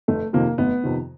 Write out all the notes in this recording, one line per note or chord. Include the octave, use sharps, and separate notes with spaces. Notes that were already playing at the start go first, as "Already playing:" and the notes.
F1 A3
F2 C3 D#3 A#3
F1 B3
F2 C3 D#3